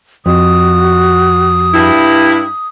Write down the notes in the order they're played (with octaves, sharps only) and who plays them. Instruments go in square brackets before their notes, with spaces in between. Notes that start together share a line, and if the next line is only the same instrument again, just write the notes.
[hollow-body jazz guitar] F2 [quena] F#4 [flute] D#6
[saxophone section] G2 E4